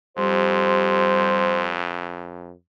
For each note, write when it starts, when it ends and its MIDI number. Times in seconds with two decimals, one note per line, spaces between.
0.17 2.52 41
0.17 1.80 55
0.17 1.80 67
0.17 1.80 72